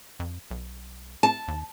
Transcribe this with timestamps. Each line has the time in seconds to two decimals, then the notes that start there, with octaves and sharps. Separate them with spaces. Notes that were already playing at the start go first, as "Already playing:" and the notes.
0.20 F2
0.51 B1
1.23 A5
1.48 D#2